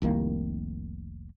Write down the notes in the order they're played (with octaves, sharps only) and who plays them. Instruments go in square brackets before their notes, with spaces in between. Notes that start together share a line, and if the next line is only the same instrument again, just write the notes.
[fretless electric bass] F1 C2 D#3 A#3